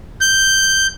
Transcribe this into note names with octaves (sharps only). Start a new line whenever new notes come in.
G6